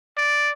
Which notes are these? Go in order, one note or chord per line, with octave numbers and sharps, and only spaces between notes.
D5